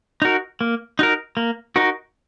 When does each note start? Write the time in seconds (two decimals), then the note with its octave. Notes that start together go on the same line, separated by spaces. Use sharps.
0.22 D#4 F#4 A#4
0.61 A#3
0.99 D#4 F#4 A#4
1.37 A#3
1.76 D#4 F#4 A#4